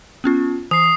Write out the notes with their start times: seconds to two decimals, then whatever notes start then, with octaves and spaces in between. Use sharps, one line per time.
0.24 B3 C#4 F4
0.71 E3 D#6 C7